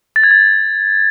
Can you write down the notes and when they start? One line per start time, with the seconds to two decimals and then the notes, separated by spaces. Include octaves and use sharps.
0.16 A6
0.23 G#6
0.31 A6